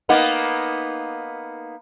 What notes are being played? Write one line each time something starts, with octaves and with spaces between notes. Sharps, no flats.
A#3 B3 D#4